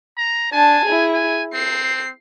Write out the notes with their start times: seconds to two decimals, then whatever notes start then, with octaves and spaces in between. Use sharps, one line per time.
0.17 A#5
0.52 D4 G#5 A5
0.85 E4 G#4
1.14 G#5
1.54 C4 C7